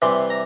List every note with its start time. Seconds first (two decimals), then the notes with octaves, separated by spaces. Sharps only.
0.02 C3 E3 G3 C6
0.30 A#5